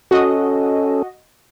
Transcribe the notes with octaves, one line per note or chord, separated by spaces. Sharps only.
C#4 F#4 A4 D#5